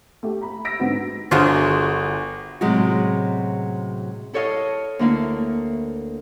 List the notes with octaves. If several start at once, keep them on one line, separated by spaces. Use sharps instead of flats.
A3 G4
A#5 B5
E6 A#6 B6 D7
G#2 D3 B3 C4 F#4
G1 D4 F4 F#4 G#4 C5
A2 C3 F#3 G#3 C#4 F#4
E4 A4 C#5 D#5 F5
D2 A#3 E4 F5